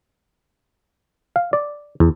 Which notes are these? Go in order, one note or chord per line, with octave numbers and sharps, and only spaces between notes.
F5
D5
E2